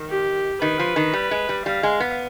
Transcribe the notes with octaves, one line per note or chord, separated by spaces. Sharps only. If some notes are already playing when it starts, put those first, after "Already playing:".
Already playing: D#3
G4
D#3 B4
F3
D#3
G3
G#3
G3
G3 F5
G#3
B3